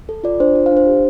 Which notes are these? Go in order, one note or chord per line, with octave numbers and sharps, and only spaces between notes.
A4
F4 D5
D4 C5
F4
C5 F5
D4
C5
G4